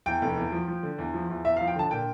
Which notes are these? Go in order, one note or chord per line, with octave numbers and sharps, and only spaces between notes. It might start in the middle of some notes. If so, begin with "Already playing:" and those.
E2 G5
F1
E2
F3
F3
D3
E2
F3
E2
E2 E5
F5
F3
G5
D3 A5
A#2 G5